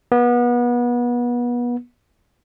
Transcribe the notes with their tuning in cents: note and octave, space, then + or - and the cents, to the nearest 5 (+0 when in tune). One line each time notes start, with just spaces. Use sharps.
B3 -30